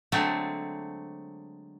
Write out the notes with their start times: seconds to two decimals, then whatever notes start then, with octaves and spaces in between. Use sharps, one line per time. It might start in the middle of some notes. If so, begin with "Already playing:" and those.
0.12 D3 F#3 G#3 A3 C4